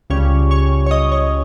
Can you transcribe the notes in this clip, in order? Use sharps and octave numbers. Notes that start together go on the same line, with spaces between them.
C#2 C#3 G3 C#4 C#5
C#5
C#5
D#5
C#5